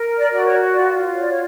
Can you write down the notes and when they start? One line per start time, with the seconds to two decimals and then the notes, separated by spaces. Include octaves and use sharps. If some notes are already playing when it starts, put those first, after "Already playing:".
Already playing: A#4
0.18 D5
0.32 F#4 D5
0.46 C#5
0.74 F4 D5
1.15 C#5
1.20 D5
1.30 C#5